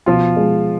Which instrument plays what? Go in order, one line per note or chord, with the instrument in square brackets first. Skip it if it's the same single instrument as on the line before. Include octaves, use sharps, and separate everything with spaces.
[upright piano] B2 [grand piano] F3 F4
[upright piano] G#3